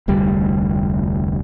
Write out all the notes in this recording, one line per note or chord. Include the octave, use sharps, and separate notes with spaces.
F1 D2 G3